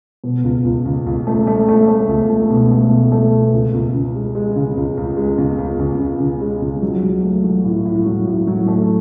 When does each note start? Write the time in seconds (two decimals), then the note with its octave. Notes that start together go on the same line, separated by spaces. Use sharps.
0.24 B2
0.44 C#2
0.65 C#2
0.85 C#2
1.06 C#2
1.27 A3
1.47 A3
1.68 A3
1.88 A3
2.09 C#2
2.30 A3
2.50 B2
2.71 A3
2.91 B2
3.12 A3
3.32 B2
3.53 C#2
3.74 C#2
3.94 C#3
4.15 G#3
4.35 G#3
4.56 C#3
4.77 C#2
4.97 C#2
5.17 G#3
5.38 C#2
5.58 C#2
5.79 C#2
6.00 C#2
6.20 C#3
6.41 G#3
6.62 C#2
6.82 F#3
7.03 F#3
7.23 A3
7.44 F#3
7.65 A2
7.85 A2
8.06 F#3
8.26 A2
8.47 F#3
8.68 A3